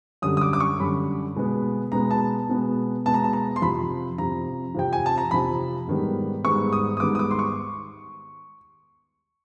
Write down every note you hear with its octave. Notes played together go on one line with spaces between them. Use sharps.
F#2 D3 G3 D#6
D#6
D6
D6
C#6
F#2 D3 G3 B5
B2 G#3 B3
B2 G#3 B3 A#5
A5
B2 G#3 B3
B2 G#3 B3 A5
A#5
A5
A#5
C6
F2 C3 F3 B5
F2 C3 F3 A#5
F2 C3 F3 G5
G#5
A5
A#5
F2 C3 F3 B5
G#2 D#3 G3 B3
G#2 D#3 G3 B3 C#6
D#6
D#6
G#2 D#3 G3 B3 D6
D#6
D6
C6
C#6